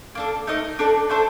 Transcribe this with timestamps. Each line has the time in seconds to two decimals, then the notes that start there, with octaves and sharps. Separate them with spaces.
0.15 A#3 D4 A4
0.47 A3 D#4 A#4 D#5
0.79 D4 A4 D5
1.09 A3 D4 A4 C5